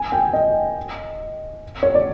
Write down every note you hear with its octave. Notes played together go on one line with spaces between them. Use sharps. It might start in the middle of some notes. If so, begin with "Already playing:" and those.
Already playing: G#5
G5
D#5
C#5
D5